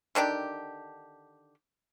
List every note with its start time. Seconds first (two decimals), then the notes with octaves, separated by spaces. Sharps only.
0.15 D3 D#3 D4 G4